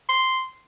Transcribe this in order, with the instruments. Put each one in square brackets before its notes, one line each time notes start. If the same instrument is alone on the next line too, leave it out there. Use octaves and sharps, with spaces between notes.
[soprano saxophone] C6